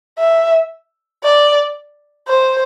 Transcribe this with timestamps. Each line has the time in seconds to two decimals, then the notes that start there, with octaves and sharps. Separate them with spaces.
0.18 E5
1.24 D5
2.28 C5